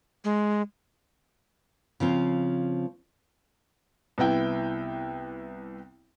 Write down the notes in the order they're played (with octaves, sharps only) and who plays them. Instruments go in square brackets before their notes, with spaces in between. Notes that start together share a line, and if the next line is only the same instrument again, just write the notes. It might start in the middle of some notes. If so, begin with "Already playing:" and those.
[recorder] G#3
[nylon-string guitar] C#3 F3 C4
[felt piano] C2 B3 E4 G5